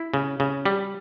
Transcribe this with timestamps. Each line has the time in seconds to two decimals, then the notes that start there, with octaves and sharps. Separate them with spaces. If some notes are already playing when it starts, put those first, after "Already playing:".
Already playing: E4
0.14 C#3
0.40 C#3
0.66 G3